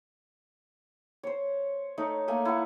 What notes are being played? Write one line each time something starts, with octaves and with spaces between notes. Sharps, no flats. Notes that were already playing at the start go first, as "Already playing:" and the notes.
C5 C#5
A3 D#4 C#5
A3 A#3 G#5
E4 F#5